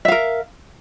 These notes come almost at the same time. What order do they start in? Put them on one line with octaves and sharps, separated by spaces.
E5 F5 A#4